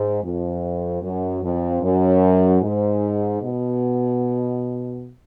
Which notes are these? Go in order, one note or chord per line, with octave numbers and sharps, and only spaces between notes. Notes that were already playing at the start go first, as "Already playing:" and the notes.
Already playing: G#2
F2
F#2
F2
F#2
G#2
B2